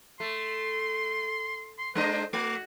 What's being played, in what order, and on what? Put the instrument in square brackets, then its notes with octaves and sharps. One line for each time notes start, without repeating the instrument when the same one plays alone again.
[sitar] A3 [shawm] C6
[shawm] C6
[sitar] G#3 D4 D#5 [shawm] C5
[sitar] A3 [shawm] F#4